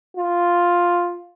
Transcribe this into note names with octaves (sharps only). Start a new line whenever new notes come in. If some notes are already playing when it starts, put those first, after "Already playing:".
F4